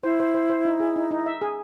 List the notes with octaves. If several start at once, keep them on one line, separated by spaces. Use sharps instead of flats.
E4 C5
C5
C5
C5
D#4
G#4
D#4
D#4
E5
G#4